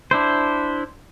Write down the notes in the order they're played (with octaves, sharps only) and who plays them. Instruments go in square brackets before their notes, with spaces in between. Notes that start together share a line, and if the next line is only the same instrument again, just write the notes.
[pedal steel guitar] D4 E4 C5